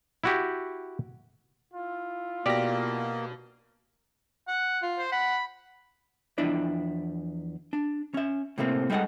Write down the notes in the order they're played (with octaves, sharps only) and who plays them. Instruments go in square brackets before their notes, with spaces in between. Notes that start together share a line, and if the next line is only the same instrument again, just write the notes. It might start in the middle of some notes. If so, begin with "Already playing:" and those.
[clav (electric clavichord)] E4 F#4 G4
[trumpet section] E4 F4
[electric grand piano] B2 A#6 [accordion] A#3 [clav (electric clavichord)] G4 D5
[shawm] F#5
[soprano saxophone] F4
[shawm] C5
[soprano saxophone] F#5 [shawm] B5
[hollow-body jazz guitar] E2 F3 D4 E4 D5
D4
C#4 E5
A2 C3 A3 A#3 C4
G3 G#3 D#4 E4 A4 F#5